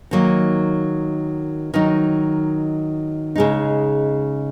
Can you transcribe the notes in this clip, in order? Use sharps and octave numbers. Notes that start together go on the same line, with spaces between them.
D#3 F#3 A#3 D#4
D#3 F#3 D#4
C#3 G#3 D#4